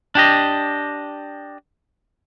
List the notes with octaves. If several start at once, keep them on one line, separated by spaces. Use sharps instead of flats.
D4 G4 D#5